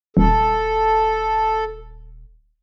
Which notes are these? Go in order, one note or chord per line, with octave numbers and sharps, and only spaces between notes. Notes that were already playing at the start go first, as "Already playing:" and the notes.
D#1 A4